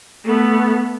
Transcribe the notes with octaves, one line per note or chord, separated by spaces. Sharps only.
A3 B3